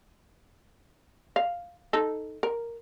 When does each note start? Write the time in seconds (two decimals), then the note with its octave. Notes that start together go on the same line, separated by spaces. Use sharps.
1.36 F5
1.93 D#4 A4
2.43 A#4